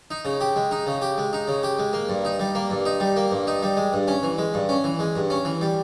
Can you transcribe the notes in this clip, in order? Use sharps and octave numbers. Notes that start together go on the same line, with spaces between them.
D#4
C#3
G4
G#3
D#4
C#3
G4
G#3
D#4
C#3
G4
G#3
A#3
G2
D#4
G3
A#3
G2
D#4
G3
A#3
G2
D#4
G3
G#3
G2
C#4
E3
G#3
G2
C#4
E3
G#3
G2
C#4
E3
G3